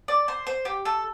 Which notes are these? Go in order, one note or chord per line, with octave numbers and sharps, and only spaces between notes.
D5
C5
C5
G4
A4